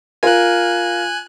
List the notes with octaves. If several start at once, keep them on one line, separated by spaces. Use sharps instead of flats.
F4 A#4 G#5 F#6